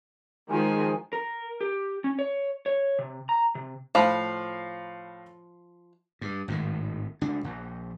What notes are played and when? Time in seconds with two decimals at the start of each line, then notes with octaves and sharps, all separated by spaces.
0.50 D#3 F3 G#3 G#5
1.13 A#4
1.61 G4
2.04 C#4
2.19 C#5
2.66 C#5
2.99 C3
3.29 A#5
3.55 C3
3.95 A2 F3 F5 B5
6.21 G2
6.48 G#1 A2 C3 D#3
7.21 C#2 D4
7.44 A#1